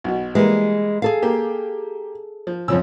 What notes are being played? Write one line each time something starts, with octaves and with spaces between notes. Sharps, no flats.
B1 B2
E3 G3 G#3 A#3
G#4 A4 F5
A#3 G4
F3
F2 C#3 F3 E6